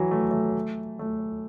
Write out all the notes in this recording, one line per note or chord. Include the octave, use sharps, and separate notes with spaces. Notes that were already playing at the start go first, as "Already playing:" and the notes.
Already playing: E3 F#3
A3
A3
A3